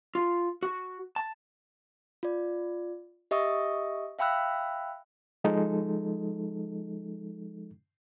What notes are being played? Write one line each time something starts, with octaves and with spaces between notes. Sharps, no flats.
F4
F#4
A5
F4 D5
G4 D#5 E5 C#6 D#6
E5 F5 G5 B5 E6 F#6
F3 G#3 D#4 A4